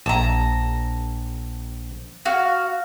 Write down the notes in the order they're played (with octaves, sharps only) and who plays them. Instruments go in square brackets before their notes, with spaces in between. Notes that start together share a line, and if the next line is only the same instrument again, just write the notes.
[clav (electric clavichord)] A#1 [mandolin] A5 A#5
[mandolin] F#4 F5